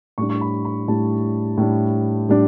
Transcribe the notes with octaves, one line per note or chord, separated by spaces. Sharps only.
A2 G3 D4 C#6
C#6
B5
B5
A2 G3 D4 A5
A2 G3 D4
A2 G3 D4